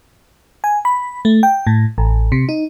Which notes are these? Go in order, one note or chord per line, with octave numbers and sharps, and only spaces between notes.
G#5
B5
A3
G5
A2
A1
C3
D#4